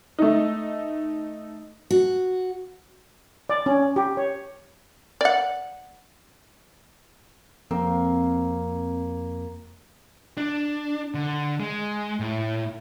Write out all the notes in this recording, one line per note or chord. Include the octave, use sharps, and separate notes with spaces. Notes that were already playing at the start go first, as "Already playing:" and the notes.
A3 D#4
F#4
D5
C#4
G4
C#5
D5 F#5
F2 A#3 C4
D4
D3
G#3
A2